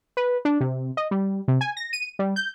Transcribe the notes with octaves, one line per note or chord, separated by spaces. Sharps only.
B4
D4
C3
D#5
G3
C3
G#5
A#6
D#7
G3
G6